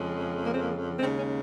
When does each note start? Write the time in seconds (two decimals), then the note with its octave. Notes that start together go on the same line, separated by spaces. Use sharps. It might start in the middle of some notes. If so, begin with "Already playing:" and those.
Already playing: F2 C#3 G#3
0.46 A#3
0.54 C4
0.63 A#3
0.99 D#2 C#3 G#3 C4
1.17 C#4